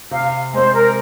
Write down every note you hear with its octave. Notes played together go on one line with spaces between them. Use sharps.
C3 F5
G#3 C4 C5
A#4